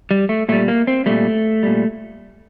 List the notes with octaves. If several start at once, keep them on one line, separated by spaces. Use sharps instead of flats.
G3
A3
A#2 G3 A3
A#3
C4
A#2 G3 A3
A#2 G3